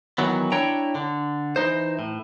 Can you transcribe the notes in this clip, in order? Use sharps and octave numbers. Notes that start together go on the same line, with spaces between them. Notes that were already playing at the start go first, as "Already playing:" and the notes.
D#3 E3 F#3 B3
D4 E4 C#5 G5 A#5
D3
E3 D#4 C5
A2